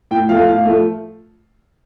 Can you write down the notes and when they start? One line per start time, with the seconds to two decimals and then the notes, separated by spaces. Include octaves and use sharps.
0.11 A2 G5
0.29 F3 A3 F5
0.48 A2 F5
0.65 F3 A3